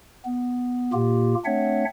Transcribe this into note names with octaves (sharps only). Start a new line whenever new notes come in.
B3
A#2 A#3 F4 G4
A3 C4 D4 C#5 E5 F#5